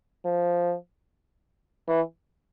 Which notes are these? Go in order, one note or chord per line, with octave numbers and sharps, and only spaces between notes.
F3
E3